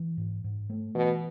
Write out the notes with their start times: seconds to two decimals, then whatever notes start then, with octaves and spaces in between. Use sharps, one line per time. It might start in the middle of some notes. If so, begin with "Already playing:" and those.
Already playing: E3
0.17 G#2
0.44 G#2
0.70 A3
0.95 B2 E3